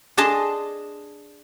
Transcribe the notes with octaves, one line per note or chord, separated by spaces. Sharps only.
D4 G#4 D#5 A5 C6